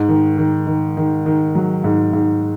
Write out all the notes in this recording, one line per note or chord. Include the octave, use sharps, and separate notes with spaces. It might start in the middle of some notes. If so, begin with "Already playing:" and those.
Already playing: G#2
D#3
D#3
D#3
D#3
D#3
F#3
G#2
G#2